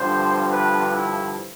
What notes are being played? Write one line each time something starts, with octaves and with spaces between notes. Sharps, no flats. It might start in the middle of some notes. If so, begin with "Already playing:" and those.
Already playing: G2 D3 F3 C5
B4
E4